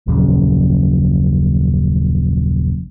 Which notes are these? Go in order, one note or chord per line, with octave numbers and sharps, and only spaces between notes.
D#1 A#1 F#2 C#3